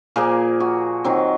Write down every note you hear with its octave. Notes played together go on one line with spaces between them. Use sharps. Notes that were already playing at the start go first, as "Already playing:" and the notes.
A#2 F3 A#3 G#4
F#4
D#3 F#3 C4